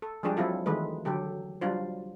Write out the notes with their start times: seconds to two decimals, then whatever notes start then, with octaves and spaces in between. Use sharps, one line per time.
0.02 A4
0.23 F3 G3 G#3 D4 G4 G#4
0.37 F#3 C4 E4 F4 A4
0.66 D#3 E3 G#3 A3 B4
1.05 D3 F#3 G4 A4
1.61 F#3 G3 D4 F4 C5